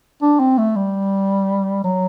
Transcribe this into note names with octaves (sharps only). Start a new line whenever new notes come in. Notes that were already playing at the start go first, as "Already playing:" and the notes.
D4
C4
A3
G3
F#3